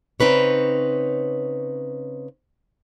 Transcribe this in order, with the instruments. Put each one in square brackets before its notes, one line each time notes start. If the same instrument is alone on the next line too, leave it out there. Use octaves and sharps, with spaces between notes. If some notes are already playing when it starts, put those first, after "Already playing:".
[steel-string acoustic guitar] C#3 C4 D#4 B4 C#5